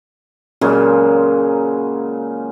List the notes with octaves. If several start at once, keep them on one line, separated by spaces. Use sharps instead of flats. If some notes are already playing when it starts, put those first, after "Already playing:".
A#2 C#3 F#3 G#3